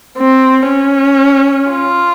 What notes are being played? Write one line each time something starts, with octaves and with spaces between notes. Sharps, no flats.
C4
C#4
F4